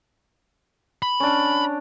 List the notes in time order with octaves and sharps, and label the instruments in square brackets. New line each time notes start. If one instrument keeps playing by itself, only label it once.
[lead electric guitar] B5
[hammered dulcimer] C#4 D4